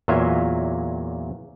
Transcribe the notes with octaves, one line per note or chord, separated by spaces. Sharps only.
E2 A#2 F#3 F4 E5 G#5